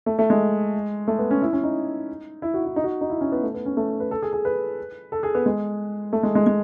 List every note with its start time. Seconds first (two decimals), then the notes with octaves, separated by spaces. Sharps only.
0.06 A3
0.19 A3
0.30 G#3
1.08 A3
1.19 B3
1.31 C#4
1.42 E4
1.53 C#4
1.63 D#4
2.42 E4
2.54 F#4
2.65 E4
2.76 D#4
2.84 F#4
3.01 D#4
3.10 E4
3.21 C#4
3.32 B3
3.43 A3
3.54 B3
3.66 C#4
3.77 A3
4.00 B4
4.11 A4
4.23 G#4
4.33 G#4
4.45 B4
5.12 A4
5.23 G#4
5.35 B3
5.46 G#3
6.13 A3
6.23 G#3
6.35 G#3
6.47 G#3